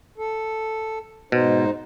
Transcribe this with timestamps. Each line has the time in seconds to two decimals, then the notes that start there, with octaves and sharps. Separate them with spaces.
0.18 A4
1.32 G#2 B2 D#4 C5